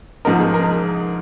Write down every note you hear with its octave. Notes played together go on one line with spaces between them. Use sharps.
G#2 F3 G#3 D#4 A#4
G#4
A#4